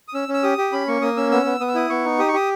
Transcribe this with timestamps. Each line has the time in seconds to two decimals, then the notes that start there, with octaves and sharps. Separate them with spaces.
0.08 D#6
0.14 C#4 E6
0.28 C#4
0.34 E6
0.43 G4 D#6
0.58 G4
0.72 C#4 B5
0.88 A#3 C#6
1.02 A#3 D#6
1.17 C#4 E6
1.31 B3 E6
1.46 B3
1.60 B3 D#6
1.68 E6
1.75 E4 D#6
1.90 B3 C#6
2.05 D#4
2.19 G4 D#6
2.28 C#6
2.34 G4 D#6